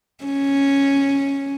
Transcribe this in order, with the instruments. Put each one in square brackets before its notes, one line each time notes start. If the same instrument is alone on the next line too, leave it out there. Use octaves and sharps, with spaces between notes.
[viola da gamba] C#4